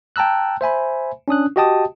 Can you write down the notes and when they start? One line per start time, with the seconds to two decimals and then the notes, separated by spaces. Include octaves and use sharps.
0.16 G5 A5 A#5 E6 F#6
0.61 C5 E5 G#5 B5
1.28 C#4 D4 D#6 F#6
1.56 F#4 G4 D#5 G5 A5 D#6